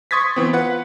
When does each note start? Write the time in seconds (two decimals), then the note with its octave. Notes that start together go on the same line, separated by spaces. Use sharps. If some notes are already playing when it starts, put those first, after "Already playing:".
0.11 C6 C#6 D#6 G#6 A6 B6
0.36 E3 B3 C4
0.53 F4 B4 F#5